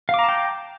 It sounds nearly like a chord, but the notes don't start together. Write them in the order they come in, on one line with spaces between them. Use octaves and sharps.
F5 D6 A#5 A5 G5